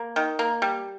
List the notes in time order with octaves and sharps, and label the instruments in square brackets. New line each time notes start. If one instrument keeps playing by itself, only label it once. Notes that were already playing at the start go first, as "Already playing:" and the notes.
Already playing: [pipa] A#3
D#3
A#3
G3